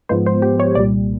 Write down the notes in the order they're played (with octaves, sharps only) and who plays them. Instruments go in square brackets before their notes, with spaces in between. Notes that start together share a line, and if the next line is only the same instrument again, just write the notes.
[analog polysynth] G#2 F3 G#3 B3 C5
C5
G4
C#5
C2 A#2 G3 D5